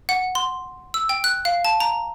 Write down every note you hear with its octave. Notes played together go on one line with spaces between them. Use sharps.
F#5
C6
E6
G5
F#6
F5
A5
A#5